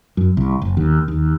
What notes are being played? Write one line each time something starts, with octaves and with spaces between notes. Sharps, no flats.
F#2
C2
F#1
D#2
D#2